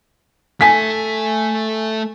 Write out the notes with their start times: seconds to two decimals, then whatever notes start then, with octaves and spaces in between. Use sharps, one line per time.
0.61 A3 A4 G#5 B6